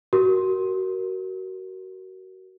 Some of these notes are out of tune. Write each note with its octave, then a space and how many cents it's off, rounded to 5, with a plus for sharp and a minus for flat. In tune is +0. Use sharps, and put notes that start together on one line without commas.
F#4 +25 A#4 +5